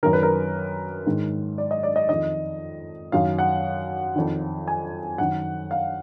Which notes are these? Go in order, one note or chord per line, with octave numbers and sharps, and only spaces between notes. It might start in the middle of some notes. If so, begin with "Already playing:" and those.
F#2 D#3 A#4
B4
A#4
G#2 D#3
D5
D#5
D5
D#5
F2 D#3 D#5
F#2 D#3 F5
F#5
F2 D#3
G#5
F#2 D#3 F#5
F5